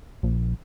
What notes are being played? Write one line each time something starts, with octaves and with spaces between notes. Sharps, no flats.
A#1